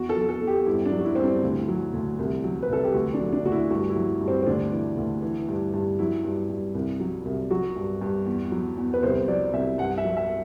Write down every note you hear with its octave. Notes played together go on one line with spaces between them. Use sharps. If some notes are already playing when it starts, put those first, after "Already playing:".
Already playing: E2 F#4
A4
F#3
A4
E2
G4
G2 E4
D4
F#3
F#4
E4
G2 C4
D4
D2 E4
F#3
D2
C2
F#3
B4
C2 A4
G4
D2 F#4
D4
F#3
D4
D2 F#4
E4
G2 F#4
E4
F#3
G2
C4
C4
D2 D4
E3
D2
E3
G2
G2
F#3 E4
G2
G2
C2
F#3
C2
F#3 F#4
G2
G2
E2
F#3
E2
B4
C2 C5
F#3 D5
C2 E5
G2 F#5
E5
F#3
E5